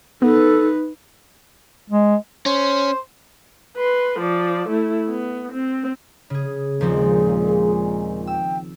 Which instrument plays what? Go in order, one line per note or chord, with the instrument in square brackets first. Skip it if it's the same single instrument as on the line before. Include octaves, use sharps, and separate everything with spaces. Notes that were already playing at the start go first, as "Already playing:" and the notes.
[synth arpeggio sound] B3 [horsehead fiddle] D#4 B4 [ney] A4
[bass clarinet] G#3
[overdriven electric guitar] C#4 [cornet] C5
[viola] B4 C6
F3 D5
A3 E4
B3
C4
[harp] C#3 G#4
[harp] D#2 F3 C4 [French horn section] A#2 G#3 [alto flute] G#4
[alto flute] G5 [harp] E6